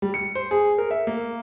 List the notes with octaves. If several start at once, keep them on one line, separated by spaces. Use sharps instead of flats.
G3
C#7
C5
G#4
A#4
E5
A#3